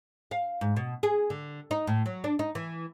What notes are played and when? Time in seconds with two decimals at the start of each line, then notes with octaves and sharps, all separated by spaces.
0.31 F5
0.61 G#2
0.76 B2
1.03 G#4
1.30 D3
1.71 D#4
1.87 A2
2.06 F#3
2.24 D4
2.39 D#4
2.55 E3